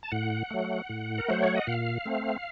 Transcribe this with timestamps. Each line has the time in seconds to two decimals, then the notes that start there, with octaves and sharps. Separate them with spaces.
0.03 A5
0.12 A2 F#5
0.50 F#3 A3
0.89 A2
1.18 A#4
1.28 F#3 A3 C5
1.43 C#5
1.55 D#5
1.67 A#2 F5
2.06 A3 C4